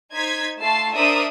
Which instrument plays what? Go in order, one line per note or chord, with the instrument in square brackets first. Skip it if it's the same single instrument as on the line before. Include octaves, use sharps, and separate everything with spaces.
[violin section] D#4 C5 G#6 B6
A3 F4 A5 C7
D4 A#4 C5 D5 E5 D#6